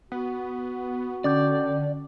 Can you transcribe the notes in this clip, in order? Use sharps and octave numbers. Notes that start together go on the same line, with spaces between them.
B3 F#4
D3 C#4 D5 D6 G6